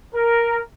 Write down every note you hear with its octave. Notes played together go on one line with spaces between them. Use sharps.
A#4